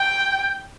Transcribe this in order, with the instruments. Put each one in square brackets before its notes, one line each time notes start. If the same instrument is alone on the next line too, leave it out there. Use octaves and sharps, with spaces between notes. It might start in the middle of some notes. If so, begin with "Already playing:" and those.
Already playing: [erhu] G5